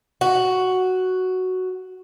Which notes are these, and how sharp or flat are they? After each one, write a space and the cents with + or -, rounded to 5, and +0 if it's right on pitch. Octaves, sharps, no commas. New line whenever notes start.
F#4 +5